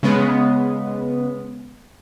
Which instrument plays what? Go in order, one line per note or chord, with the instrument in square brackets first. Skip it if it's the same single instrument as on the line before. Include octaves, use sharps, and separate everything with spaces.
[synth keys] C#3 G#3 B3